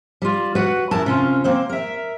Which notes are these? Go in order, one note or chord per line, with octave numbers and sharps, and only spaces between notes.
G3 F4
F#4 B4 F#5
F#2 E4 A#4 A5
C3 C#4 F4
A#3 C4 C5
A#4 E5